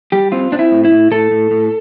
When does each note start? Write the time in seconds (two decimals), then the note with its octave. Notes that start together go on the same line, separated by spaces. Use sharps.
0.12 G3 G4
0.32 C4 F4
0.52 C4 D4
0.59 E4
0.72 A2
0.85 E4
0.92 A2
1.11 A2 A4
1.31 A2
1.51 A2